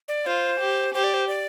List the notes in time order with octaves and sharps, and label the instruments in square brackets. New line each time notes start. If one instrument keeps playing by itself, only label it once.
[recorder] D5
[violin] F4 [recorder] C5
[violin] G4
[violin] G4 [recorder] C5
[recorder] D5
C5
D5